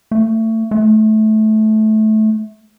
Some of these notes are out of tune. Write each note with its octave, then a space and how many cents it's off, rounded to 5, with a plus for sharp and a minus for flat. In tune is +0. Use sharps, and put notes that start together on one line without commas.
A3 +25
A3 -20